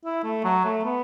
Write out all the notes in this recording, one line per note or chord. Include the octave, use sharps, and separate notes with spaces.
E4
A3
F#3
A3
B3